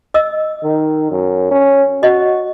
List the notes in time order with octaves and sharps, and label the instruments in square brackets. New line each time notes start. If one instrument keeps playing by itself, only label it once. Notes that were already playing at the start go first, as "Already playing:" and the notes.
[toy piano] D#5 E6
[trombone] D#3
F#2
C#4
[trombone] F#4 [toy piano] D#5